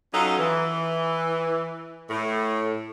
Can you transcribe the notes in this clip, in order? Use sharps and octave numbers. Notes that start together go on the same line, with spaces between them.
F#3 C#4 D#4 F4 A4
E3
A2